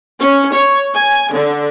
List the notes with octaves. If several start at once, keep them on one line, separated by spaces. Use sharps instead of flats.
C#4
C#5
G#5
D3